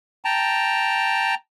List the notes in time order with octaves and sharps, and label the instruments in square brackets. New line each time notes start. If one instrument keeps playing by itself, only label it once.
[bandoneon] G5 A5 A#5